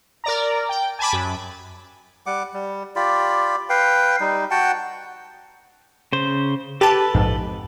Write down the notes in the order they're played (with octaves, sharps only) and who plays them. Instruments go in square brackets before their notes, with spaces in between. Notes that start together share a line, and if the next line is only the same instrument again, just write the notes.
[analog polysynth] A#4 D5 A#5
G5
G#5 A5 B5 D6
F#2
[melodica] G3 F#5 D6
G3
F4 G4 D5 B5
B4 F5 G5
G3 D#4
F#4 F#5 G5 A5
[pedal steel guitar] C#3 C5
[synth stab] G4 A5 [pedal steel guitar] A4 B4
[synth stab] A#1 F2 G#2